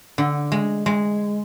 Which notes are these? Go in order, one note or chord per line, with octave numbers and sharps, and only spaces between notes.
D3
G#3
G#3